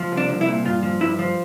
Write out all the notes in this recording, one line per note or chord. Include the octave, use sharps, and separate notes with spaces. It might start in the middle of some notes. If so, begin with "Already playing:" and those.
Already playing: F3
C2
D4
C2
E4
A#2
G2 F4
F3
G2 E4
F3